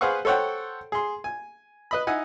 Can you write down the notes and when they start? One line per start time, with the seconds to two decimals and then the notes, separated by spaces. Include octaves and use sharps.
0.01 G#4 B4 C5 F5 F#5 C#6
0.25 A4 C5 C#5 F#5 G5
0.92 G#4 C6
1.24 G#5
1.91 B4 D#5 B5
2.07 D#4 E4 F#5 G#5